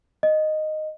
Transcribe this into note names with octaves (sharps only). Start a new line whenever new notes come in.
D#5